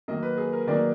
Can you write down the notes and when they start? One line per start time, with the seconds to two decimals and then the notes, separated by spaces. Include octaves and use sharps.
0.08 D#3 F#3 A#3 D#5
0.23 B4
0.38 G#4
0.53 A#4
0.67 D#3 F#3 A#3 D5